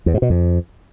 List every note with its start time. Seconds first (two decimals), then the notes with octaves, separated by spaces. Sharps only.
0.06 E2
0.14 G#2
0.22 B2
0.30 F2